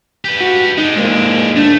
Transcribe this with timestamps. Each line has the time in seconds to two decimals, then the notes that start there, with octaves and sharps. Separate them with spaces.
0.25 G4 B4
0.41 F#4
0.78 G#3 D4 D#4
0.96 G#2 A#3
1.56 A3 D4